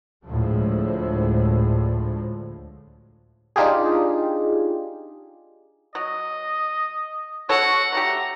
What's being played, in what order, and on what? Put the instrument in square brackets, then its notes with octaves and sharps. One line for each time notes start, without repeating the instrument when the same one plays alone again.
[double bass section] D2 A2 F3 G#3
[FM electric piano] D4 D#4 F4 G4 G#4
[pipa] F#3 [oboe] D#5
[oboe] F#4 [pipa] A4 C#5 [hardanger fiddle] F#5
[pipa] A3 F#4 G4 [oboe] A#5